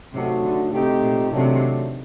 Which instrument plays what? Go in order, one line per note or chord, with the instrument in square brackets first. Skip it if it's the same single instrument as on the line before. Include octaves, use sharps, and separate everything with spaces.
[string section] C3 [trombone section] F#3 A3 D#4 F#4
[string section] D3
[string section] C3 [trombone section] A3 C4 D#4 G4
[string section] A#2
[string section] C3 [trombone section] D#3 F#3 A3 D4